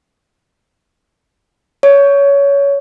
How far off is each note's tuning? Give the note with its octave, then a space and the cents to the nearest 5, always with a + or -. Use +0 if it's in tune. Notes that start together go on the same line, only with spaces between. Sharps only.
C#5 +20